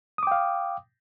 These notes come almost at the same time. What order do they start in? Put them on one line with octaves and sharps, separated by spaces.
D#6 D6 G5 F5